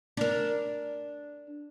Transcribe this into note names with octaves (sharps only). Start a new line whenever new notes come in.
D4 A#4